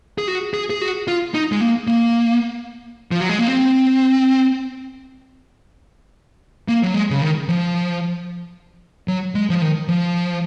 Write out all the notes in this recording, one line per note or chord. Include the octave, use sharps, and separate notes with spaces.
G#4
F#4
G#4
G#4
F#4
F4
D#4
G#3
A#3
A#3
F3
F#3
G#3
A#3
C4
A#3
F#3
G#3
C#3
D#3
F3
F#3
G#3
F3
D#3
F3